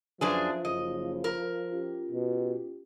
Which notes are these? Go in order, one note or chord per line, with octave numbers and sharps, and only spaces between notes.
F#2 F3 D4 F4 G#4 B4 E5
F#1 C#3 D#5
A#4
C#4 F4 G4
B2